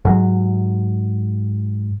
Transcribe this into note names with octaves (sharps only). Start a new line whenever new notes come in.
G#2 F#3